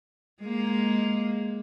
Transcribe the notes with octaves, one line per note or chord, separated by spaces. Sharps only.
G#3 A#3